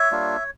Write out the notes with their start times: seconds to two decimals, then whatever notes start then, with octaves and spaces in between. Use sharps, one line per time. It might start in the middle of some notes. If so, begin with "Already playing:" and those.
Already playing: C#5 E5
0.11 G3 A#3 D4 F4